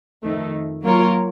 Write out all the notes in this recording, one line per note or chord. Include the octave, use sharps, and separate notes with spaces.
F2 D#3 A3
F#3 A#3 F4 A#4 C#5